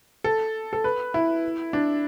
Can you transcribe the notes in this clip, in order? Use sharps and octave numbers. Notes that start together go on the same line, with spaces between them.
A4
A4
B4
E4
D4